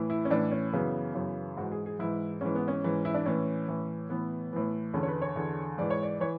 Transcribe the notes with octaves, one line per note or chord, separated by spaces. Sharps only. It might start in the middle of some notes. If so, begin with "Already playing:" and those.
Already playing: A2 E3
E4
C#4
A2 E3 D4
C#4
F#2 C#3 E3 B3
F#2 C#3 E3
G#2 E3 F#4
G#4
G#4
G#2 E3 E4
G#2 E3 C#4
B3
C#4
G#2 E3
E4
D4
A2 E3 C#4
A2 E3
A2 E3 B3
A2 E3
E2 D3 C#4
C#5
B4
C#5
E2 D3
G#2 E3 D5
C#5
D5
E3 C#5